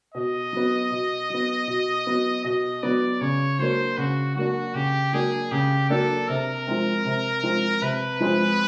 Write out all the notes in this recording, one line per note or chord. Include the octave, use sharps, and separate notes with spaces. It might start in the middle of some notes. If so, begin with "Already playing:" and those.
B2 D#5
F#3 B3
B2
F#3 B3
B2
F#3 B3
B2 D#5
F#3 B3 D5
C#3 C#5
F#3 A#3 D4 C5
C#3 F#4
F#3 A#3 D4 F#4
C#3 G4
F#3 A#3 D4 G#4
C#3 G4
F#3 A#3 D4 A4
C3 A#4
F3 G#3 C4
C3
F3 G#3 C4
C3 B4
F3 G#3 C4